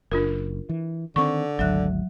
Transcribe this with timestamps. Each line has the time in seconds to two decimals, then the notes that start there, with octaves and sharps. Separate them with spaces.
0.12 F#1 D4 F4 A#4
0.69 E3
1.16 D3 D#3 C4 C#6
1.59 G#1 D2 F#3 E5 F#6